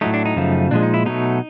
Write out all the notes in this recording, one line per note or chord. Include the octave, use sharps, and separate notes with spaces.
A2 F#3 A3 D#4
D4
D#4
F#2 C#3 F3 A3
A#2 F3 G#3 D4
D#4
E4
B2 F#3 A3 D#4